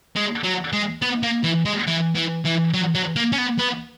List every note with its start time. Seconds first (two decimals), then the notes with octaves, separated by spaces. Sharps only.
0.16 G#3
0.44 F#3
0.73 G#3
1.02 B3
1.23 A#3
1.44 E3
1.66 G#3
1.88 E3
2.15 E3
2.45 E3
2.74 F#3
2.95 F#3
3.16 A#3
3.32 C#4
3.38 B3
3.59 B3